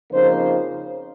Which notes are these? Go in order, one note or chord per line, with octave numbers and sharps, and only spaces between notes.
F2 C#3 F3 A#3 D#4 C5